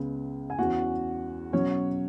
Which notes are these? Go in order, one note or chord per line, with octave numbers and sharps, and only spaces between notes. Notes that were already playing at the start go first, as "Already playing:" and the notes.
Already playing: C#2 C#3 G#3 B3
G#5
E2 E3 C#4 F#4 F#5
B2 F#3 C#4 C#5